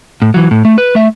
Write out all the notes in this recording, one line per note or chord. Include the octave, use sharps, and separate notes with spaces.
A2
E3 F#3
A2
A3
B4
A3 E5